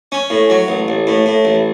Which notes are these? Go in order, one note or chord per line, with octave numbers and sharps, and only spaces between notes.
C#4
A2
F#3
A1
A1
A2
A2
A1